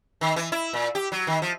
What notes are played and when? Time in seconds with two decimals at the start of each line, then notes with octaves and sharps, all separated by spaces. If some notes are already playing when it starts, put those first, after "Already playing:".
0.21 D#3
0.36 E3
0.52 E4
0.73 A#2
0.95 G4
1.12 F#3
1.27 D#3
1.42 F3